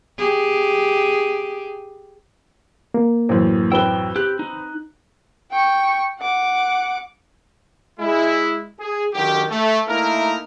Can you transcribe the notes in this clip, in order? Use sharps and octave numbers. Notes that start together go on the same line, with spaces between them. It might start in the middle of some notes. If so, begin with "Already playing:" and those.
G4 G#4
A#3
A1 F#2 C5
C4 B4 G5 E6 G7
G4 F#6
D#4
G5 C#6
F#5 D6
G#3 E4
G#4
F#2 D3 D#3 G4
A3
A3 A#3 D#4 E4 A#4